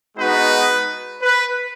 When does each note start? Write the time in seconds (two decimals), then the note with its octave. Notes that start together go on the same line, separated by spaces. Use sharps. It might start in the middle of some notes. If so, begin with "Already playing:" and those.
0.16 G#3 B3 D#4 F#4 B4
1.21 B4